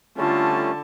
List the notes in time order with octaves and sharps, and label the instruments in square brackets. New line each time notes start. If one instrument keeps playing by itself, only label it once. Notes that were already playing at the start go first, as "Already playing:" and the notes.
[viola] D3 A5 [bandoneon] G3 A3 C#4 [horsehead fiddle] F4